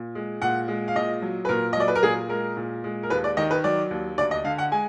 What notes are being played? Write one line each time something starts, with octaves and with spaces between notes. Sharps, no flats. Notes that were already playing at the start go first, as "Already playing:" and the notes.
Already playing: A#2
G#3
A#2 F#5
G#3
F5
A#2 D#5
F#3
B4
A#2 A#4
D#5
F#3 D5
B4
A#4
A#2 G#4
G#3 A#4
A#2
G#3
A#4
D#2 B4
D5
D#3 D#5
B4
F#3 D5
D#2
D2 D5
D#5
D3 F5
F#5
G#3 G#5